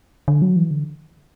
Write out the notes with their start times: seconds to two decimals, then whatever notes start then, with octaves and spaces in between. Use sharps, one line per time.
0.28 D3
0.42 F#3
0.56 E3
0.71 D3